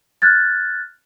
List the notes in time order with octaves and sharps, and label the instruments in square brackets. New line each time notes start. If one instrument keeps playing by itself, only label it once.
[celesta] F6 F#6 G#6 A6